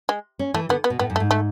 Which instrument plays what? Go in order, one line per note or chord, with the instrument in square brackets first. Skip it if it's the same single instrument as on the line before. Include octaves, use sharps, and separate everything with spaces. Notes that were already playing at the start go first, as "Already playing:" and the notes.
[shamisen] G#3
[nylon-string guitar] C#4
[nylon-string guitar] E3 [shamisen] A3
[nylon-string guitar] D3 [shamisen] B3
[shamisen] B3
[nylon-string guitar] B2
[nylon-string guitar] A2 [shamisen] B3
[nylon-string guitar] F#2
[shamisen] A3
[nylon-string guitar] G#2
[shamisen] A3